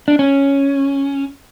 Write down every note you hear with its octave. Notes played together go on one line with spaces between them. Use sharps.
D4
C#4